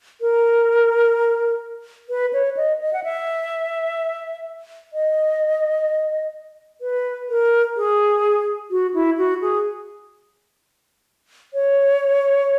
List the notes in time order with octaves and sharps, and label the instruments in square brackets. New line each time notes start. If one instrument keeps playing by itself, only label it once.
[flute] A#4
B4
C#5
D#5
D#5
F#5
E5
D#5
B4
A#4
G#4
F#4
E4
F#4
G#4
C#5